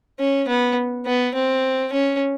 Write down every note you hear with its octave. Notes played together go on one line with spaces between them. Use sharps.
C#4
B3
B3
C4
C#4